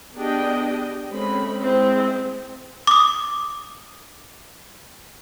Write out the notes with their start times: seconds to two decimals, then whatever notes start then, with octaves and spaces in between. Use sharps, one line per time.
0.15 B3 D4 G4 G#4 D#5 G5
1.10 G#3 A3 C4 C#4 B5
1.62 G#3 C4 E4 G#4
2.87 D6 D#6